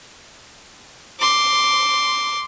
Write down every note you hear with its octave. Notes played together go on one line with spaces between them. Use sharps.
C6 D6